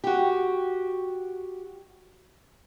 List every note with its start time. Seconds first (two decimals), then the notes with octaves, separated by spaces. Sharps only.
0.04 F#4 G4